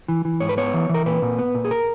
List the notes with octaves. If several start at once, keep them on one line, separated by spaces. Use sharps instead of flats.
E3
E3
G#2 C#5
B4
B3 C#5
E3
E3
A#4
A#2 B4
A#2
B3
A#2
G#4
A#4